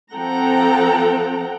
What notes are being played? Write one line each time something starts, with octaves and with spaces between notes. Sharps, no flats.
F3 C4 A4 F#5 G5 A#5